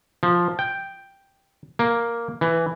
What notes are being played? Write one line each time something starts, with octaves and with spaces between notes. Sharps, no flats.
F3
G5
A#3
E3